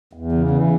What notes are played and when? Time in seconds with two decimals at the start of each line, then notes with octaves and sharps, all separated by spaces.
0.13 E2
0.32 C#3
0.51 E3